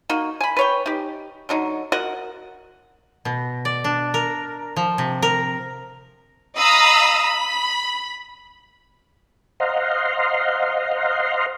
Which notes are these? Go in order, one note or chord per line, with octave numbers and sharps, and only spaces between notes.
A#3 D#4 F#4
G#5 B5
B4 C#5 G5
D#4 G4
D3 F#3 D#4
F#4 A#4 D#5 F#5
B2
D5
D4
A#4
F3
C3
A#4
D#5 F5 A#5 B5 D#6 E6
B5
C5 D#5 F5 F#5 A#5 C6